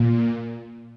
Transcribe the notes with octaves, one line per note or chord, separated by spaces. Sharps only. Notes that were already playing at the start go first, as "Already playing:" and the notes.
Already playing: A#2